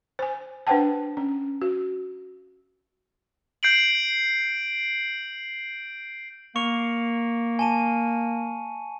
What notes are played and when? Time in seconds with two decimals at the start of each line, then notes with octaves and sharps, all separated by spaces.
0.19 C5 G#5
0.67 D4 B4 C5 F#5 G5 A5
1.17 C#4
1.62 F#4
3.63 G6 C7 D7 F#7
6.56 A#3 C#6 C#7 F7
7.59 G#5 A5 D#7